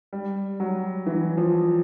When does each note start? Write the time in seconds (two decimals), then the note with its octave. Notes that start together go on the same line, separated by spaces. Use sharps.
0.13 G3
0.60 F#3
1.07 E3
1.37 F3